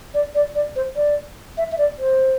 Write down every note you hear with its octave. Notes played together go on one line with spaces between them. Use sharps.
D5
D5
D5
C5
D5
E5
E5
D5
C5